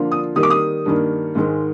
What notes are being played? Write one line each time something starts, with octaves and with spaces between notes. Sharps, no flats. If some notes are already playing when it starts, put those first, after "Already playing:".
Already playing: D3 F3 A#3 D4 F4
D#6
D#3 G3 A#3 D#6
D6
D#6
G2 D#3 A#3
G#2 D#3 G#3